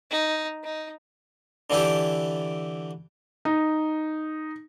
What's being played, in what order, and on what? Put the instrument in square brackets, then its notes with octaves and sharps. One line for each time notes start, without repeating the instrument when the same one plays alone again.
[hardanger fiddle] D#4
D#4
[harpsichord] D3 E3 D4 E4 G4
[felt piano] D#4